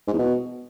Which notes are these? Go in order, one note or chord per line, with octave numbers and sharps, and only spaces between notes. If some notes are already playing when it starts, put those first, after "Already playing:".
G#2
E2
B2